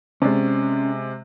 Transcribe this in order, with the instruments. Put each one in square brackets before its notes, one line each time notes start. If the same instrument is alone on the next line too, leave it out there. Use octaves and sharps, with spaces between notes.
[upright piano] C3 G#3 [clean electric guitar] C#4 D5